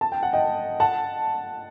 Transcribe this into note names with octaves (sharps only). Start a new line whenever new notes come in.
A5
G5
F#5
D#5 G5
F#5 A5